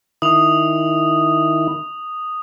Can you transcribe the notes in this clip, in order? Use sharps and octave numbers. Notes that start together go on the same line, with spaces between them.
D#3 E4 D#6 F7